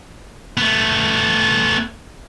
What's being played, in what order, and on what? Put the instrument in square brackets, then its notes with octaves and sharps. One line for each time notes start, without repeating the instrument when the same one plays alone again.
[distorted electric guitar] A3 B3